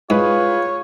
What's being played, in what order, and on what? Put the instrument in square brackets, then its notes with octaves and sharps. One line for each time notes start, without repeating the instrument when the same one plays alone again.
[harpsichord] G#2 [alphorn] F4 [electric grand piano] G#4 B4 [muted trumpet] C#5